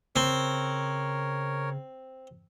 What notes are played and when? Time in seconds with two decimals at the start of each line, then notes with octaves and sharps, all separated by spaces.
0.16 C#3 C4 A#4 C#5